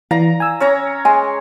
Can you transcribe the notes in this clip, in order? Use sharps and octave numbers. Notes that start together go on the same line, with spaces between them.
E3 D5 F5 A#5
G#5 E6
C#4 C#5 A#5
G#3 G#5